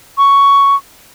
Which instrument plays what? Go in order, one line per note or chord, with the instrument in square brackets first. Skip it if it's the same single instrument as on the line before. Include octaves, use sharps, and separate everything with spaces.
[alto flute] C#6